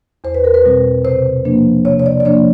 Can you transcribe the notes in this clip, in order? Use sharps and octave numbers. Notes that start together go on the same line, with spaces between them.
E2 C5
B4
A#4
B4
B2 G3 C4
C3 C5
F3 A#3 D4
C3 C#5
C#5
D5
D5
F3 A#3 D4 C#5